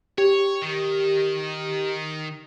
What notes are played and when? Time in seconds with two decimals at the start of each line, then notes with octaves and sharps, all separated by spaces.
0.18 G4 C#5
0.62 D#3